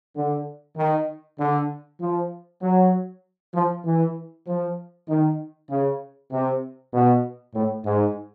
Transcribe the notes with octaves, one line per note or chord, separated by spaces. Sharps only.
D3
D#3
D3
F3
F#3
F3
E3
F3
D#3
C#3
C3
B2
A2
G#2